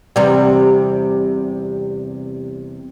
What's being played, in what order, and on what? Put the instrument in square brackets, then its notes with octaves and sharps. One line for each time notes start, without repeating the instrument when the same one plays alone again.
[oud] E2 C3 G3